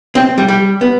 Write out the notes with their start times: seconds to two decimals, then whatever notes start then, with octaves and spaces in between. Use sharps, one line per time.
0.15 C4
0.38 G3
0.48 G3
0.81 B3